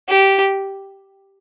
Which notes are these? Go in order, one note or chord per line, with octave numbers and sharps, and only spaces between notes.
G4